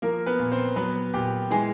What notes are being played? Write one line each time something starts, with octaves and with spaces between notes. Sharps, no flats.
F3 A#3 A#4
B3 B4
A#2
C4 C5
F#3 B3 B4
A#2 G4
E3 G#3 G#4